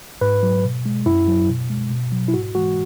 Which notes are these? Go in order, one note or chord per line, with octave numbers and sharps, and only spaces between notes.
G#2 B4
F#3
B2
G#3
F#2 E4
F#3
B2
G#3
B2
F#3
E4
G#2 F#4
E3 G#3 F#4